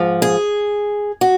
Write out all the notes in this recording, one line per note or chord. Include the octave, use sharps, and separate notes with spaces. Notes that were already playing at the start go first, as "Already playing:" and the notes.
Already playing: G#2 F3
G#4
F#4